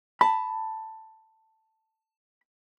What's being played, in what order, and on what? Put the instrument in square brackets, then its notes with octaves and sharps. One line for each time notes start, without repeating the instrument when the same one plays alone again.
[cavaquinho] A5 [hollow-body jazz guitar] B5